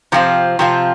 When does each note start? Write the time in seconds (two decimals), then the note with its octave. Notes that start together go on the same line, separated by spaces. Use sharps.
0.12 C3 F3 C4 F4
0.59 C3 F3 C4 F4